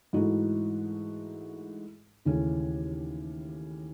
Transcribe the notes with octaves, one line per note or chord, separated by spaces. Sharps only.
G#2 E3 A3 D#4 F#4
D#2 C#3 E3 A3 C#4